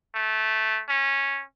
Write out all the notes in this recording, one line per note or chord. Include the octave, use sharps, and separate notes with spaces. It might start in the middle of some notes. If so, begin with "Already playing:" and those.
A3
C#4